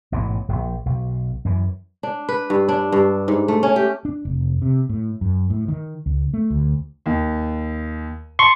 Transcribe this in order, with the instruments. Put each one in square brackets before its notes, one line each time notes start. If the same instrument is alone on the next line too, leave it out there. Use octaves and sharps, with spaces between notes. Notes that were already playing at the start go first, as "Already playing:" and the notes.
[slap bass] A1 G#2 B2 E3
E1 A#1
B1
F#2 E3
[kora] D4
B4
G2
D4
G2
G#2
A3
C#4
G4
[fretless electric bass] D4
F1
C3
A2
F#2
A2
D#3
C#2
A3
D2
[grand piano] D#2
[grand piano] A5 [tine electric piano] C6 C#6